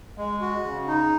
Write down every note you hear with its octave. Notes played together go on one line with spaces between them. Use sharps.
G#3
F#4
C#3
D#4